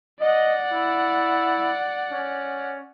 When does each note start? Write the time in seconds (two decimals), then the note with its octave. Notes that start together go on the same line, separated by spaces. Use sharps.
0.20 D5 D#5 F#5
0.72 E4
2.11 C#4